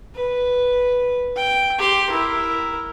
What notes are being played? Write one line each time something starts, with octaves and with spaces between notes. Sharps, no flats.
B4
G5
G4 C6
E4 A#4